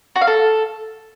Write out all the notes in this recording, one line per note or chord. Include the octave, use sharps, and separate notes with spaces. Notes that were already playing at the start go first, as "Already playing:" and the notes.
F#4
F5
A4